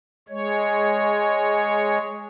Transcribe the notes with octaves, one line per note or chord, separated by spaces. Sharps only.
G#3 C#5